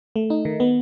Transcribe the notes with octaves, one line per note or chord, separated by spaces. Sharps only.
A3
D#4
D#3
B3